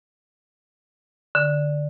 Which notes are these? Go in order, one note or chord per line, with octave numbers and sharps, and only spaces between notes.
D3